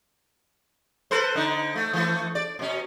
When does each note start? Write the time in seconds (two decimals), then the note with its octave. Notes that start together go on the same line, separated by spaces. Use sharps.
1.11 A4 B4 C5
1.35 D3 D#4
1.75 A3
1.93 E3 A3
2.35 D5
2.59 B2 C#4